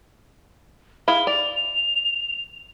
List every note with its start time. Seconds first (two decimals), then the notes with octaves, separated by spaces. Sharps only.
1.08 E4 G#4 F5 G7
1.27 D5 F7